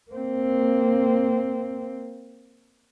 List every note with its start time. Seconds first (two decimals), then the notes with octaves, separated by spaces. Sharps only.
0.11 A#3 C4